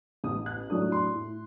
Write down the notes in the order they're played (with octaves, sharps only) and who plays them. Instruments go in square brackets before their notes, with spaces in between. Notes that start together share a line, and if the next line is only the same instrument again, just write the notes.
[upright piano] A1 D#6
F#6
A2 F#3 A3 D4 D#6
C6
A2